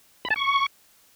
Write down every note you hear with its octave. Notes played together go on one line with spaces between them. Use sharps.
B5
A5
C#6